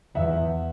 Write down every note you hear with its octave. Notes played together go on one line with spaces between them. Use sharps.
E2 E5 F#5